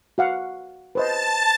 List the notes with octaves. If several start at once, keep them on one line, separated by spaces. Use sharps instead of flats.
F#4 F5 F#5
B4 C5 D#5 A5 A6